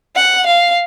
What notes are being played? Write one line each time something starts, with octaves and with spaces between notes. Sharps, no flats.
F#5
F5